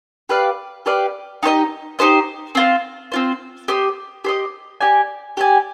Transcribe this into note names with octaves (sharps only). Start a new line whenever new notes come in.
G4 B4 D5 F5
G4 B4 D5 F5
D#4 G4 C5 D#5
D#4 G4 C5 D#5
C4 F4 C5
C4 F4 C5
G4 C5 D#5
G4 C5 D#5
G4 D5 G#5
G4 D5 G#5